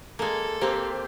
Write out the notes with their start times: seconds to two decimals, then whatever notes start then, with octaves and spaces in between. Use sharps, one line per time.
0.19 G#3 A#3 A4
0.61 A#3 C4 G4 C5